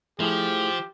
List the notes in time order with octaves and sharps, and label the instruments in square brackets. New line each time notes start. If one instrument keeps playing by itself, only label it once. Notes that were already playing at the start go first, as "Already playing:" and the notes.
[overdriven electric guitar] F3 [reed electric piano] A3 E4 G#4 [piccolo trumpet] G4